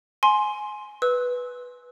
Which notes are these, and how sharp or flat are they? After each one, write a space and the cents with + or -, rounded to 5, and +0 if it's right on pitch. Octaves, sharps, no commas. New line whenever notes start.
G#5 +15 C6 +10
B4 +0 E6 -25